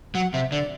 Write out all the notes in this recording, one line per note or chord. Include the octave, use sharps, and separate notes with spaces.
F#3 F#5
C3 E5
D3 D5